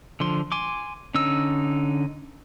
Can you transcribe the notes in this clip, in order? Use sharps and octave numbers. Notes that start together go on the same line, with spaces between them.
D3 F3 C6
G#5 C6 D6
D3 C#4 D#4 E6